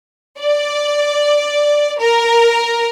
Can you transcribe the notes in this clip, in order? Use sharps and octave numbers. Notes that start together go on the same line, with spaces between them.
D5
A#4